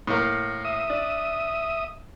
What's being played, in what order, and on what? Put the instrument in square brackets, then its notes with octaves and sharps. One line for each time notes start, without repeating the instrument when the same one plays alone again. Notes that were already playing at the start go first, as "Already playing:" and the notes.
[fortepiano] A2 A#3
[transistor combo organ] E5 D#6
[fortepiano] D4